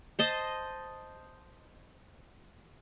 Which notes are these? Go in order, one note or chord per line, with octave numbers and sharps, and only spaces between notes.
C5 D#5 A5